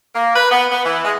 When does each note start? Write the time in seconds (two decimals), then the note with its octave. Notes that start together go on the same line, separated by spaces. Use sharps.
0.15 A#3
0.36 B4
0.51 B3
0.71 B3
0.85 E3
1.05 G#3